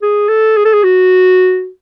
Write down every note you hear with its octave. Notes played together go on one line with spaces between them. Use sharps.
G#4
A4
G#4
A4
G#4
F#4